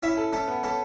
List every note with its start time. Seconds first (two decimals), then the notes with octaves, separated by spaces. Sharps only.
0.03 C#4 E4 E5
0.17 A4
0.33 A3 C#4 A4
0.48 B3
0.63 A3 C#4 A4